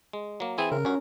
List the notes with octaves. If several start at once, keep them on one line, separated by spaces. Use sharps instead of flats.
G#3
F#3 A#3
E3 C4 E4 G#4
C#3 A#4
G2 C#4 F#4